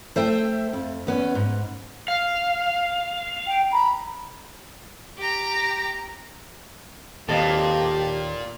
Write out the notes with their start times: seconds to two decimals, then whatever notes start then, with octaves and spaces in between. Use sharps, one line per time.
0.16 A3 C5 E5 G5
0.73 F2
1.07 E2 B3 C#4
1.35 G#2
2.08 F5
3.47 G5
3.71 A#5 B5
5.18 G4 A#5
7.29 D#2 A#2 G4 A4 D#5 F5